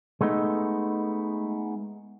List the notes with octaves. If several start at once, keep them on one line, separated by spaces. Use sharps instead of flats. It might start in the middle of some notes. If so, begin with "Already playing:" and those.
G#3 A3 B3 D#4